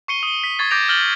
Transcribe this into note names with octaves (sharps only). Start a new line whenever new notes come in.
C#6 C7 C#7 D#7 G7
D#6 G7
B6
C#6 G#6 A6 C7
D6 G6 A6 A#6 D7 F7
F6 G6 A6 F#7 G7